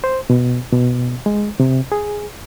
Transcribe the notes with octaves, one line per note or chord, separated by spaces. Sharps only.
C5
B2
B2
G#3
C3
G#4